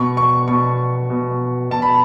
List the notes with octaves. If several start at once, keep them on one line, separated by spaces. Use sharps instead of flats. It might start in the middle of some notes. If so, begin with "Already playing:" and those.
Already playing: B2 C#6
C#6
B2 C#6
B2
B2 A5
B5